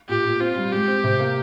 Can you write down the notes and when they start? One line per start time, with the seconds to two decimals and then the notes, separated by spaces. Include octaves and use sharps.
0.09 A#2 G4
0.25 A#2
0.40 C4 F4
0.56 G3
0.72 G#3 G4
0.88 C4
1.04 C3
1.20 A#3